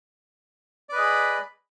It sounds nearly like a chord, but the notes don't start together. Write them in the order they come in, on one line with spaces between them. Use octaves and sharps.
D5 B4 D#5 G#4 B5